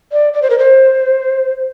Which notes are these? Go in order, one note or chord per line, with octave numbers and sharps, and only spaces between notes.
D5
D5
C5
A#4
C5